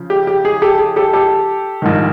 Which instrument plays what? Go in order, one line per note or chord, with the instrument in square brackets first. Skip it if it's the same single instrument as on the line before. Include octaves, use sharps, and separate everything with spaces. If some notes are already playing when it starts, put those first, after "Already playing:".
Already playing: [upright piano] C#3 F3
G4
G4
G#4
G4 A4
G#4
G4 A4
G4 A4
A#1 G#2 D#3